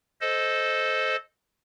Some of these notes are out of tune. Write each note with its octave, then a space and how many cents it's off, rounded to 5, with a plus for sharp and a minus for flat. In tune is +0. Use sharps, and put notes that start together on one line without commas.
A4 -10 C5 +0 D#5 +0